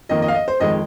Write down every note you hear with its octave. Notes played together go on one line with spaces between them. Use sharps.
F2 D#3 A#3 D#5
D#5
F5
D#5
C5
F2 D#3 G#3 D#5